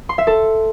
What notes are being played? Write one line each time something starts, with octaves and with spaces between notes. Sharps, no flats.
C6
E5
A4